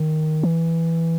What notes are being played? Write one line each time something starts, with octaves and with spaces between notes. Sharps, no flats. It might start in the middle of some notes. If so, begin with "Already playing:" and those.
Already playing: D#3
E3